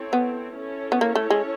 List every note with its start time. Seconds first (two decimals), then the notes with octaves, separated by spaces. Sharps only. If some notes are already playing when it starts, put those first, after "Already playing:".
Already playing: C4 E4 A4 C#5
0.13 B3
0.56 C#4 E4 A4 C#5
0.92 B3
1.01 A#3
1.15 A3
1.30 G#3